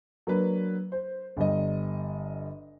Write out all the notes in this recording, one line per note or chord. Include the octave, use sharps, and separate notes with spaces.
F#3 A#3 D4 B4
C5
G1 G3 D#5